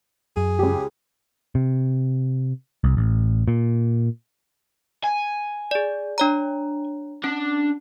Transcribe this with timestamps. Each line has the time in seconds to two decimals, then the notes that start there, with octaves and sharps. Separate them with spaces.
0.37 F#2 G#4
0.59 C#2 G4
1.55 C3
2.84 C2
2.97 A1
3.48 A#2
5.04 G#5
5.71 G#4 D5
6.18 D4 C#5 A#5
7.24 C#4 D4